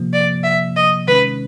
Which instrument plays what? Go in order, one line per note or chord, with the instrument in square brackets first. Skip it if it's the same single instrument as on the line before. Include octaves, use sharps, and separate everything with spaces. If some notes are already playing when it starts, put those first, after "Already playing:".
Already playing: [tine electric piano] C3 F3 A#3
[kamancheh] D5
E5
D#5
[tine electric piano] C3 D#3 G#3 C#4 [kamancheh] B4